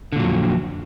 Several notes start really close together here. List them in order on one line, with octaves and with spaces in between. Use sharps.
D3 A#2 F#3 F2